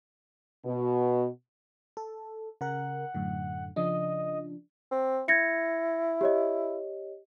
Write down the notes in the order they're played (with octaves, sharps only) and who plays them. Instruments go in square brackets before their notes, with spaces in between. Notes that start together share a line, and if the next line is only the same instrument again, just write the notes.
[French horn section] B2
[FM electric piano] A4
[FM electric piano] C#3 A#4 [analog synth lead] F#5
[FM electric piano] F#2 A2 D3
[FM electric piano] C#3 F3 D4 [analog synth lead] D#5
[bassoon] C4
[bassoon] E4 [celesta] G#6 A#6 C#7
[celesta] G4 C#5 D#5